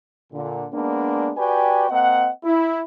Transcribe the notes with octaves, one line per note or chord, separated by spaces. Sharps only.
A#2 D3
G#3 A#3 B3 D4
F#4 G4 B4 D5 G5 G#5
A#3 C4 D#5 F#5
E4